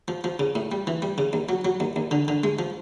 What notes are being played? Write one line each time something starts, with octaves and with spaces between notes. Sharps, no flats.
F3
F3
C#3
A2
G3
E3
G3
C#3
D#2
F#3
F#3
D#2
D#2
D3
D3
G#3
F3